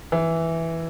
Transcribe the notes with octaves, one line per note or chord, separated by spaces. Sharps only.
E3